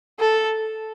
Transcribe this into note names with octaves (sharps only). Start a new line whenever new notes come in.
A4